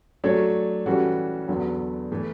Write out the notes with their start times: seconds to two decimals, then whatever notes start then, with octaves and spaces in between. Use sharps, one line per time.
0.24 F#3 A3 D4 A4 C#5
0.86 E3 G3 C#4 F#4 A4
1.48 E2 D3 F#3 B3
2.12 E3 A3